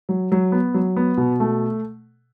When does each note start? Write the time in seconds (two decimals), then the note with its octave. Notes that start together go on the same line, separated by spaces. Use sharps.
0.09 F#3
0.32 F#3
0.52 B3
0.74 F#3
0.96 B3
1.17 B2
1.40 A3